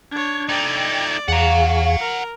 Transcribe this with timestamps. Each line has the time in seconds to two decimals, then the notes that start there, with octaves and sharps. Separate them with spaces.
0.12 D4 C#5 G#6
0.49 A3 D#4 D5 G5
1.28 E2 G#4 F5 F#5 A#5 C#6
2.00 A#4